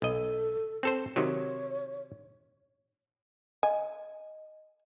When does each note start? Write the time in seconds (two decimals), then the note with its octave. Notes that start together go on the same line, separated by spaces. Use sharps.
0.02 B1 A4 D#5
0.83 C4 A4 C5
1.16 C3 D#3 F#3 C#5
3.63 D#5 G#5